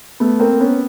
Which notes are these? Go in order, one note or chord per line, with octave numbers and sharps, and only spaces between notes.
A3 B3
A#3 C4
B3 C#4